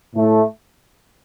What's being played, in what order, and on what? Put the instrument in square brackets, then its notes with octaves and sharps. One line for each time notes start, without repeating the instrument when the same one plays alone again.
[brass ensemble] A2 A3